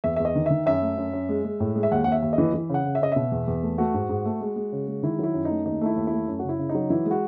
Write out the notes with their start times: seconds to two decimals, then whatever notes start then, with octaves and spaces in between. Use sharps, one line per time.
0.04 E2 E5
0.16 E5
0.20 E2
0.25 D#5
0.35 D#3
0.46 D#3 E5
0.66 F#2 E5
0.82 A3
0.98 F#2
1.13 F#2
1.29 G#3
1.45 G#3
1.60 A2
1.76 G#3
1.83 E5
1.91 D#2 F#5
2.04 D#2 F#5
2.12 E5
2.22 D#2
2.33 D#5
2.38 E3
2.54 E3
2.69 C#3 F#5
2.85 C#3
2.95 E5
3.01 C#3 D#5
3.12 B2 E5
3.32 E2
3.48 E2
3.63 A3
3.78 A3 F#4
3.94 G#2
4.09 G#2
4.25 A3
4.41 G#3
4.56 G#3
4.72 C#3
4.87 G#3
5.03 D#3 E4
5.19 F#3 E4
5.34 F#2
5.45 D#4
5.50 A3
5.66 D#2 D#4
5.81 A3 E4
5.96 D#2
6.07 E4
6.12 A3
6.28 F#2
6.39 C#3 F#4
6.49 E4
6.59 C#3
6.69 D#4
6.75 F#3
6.90 E3 E4
7.05 G#3
7.11 F#4